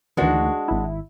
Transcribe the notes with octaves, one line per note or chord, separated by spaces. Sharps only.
D2 D#3 E3 G#3 D4 F#4
G#1 E4